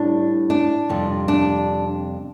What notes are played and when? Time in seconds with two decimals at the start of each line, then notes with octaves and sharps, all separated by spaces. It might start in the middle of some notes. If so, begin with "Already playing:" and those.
Already playing: A2 G3 D4
0.50 D4
0.89 F2 C3 G3
1.28 D4